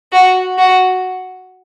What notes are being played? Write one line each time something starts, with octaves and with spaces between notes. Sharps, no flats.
F#4
F#4